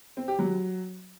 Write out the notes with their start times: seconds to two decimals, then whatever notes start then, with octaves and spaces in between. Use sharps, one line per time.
0.17 C4
0.28 G4
0.39 F#3